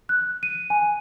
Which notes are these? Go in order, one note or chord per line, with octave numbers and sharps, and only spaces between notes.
F#6
D#7
G#5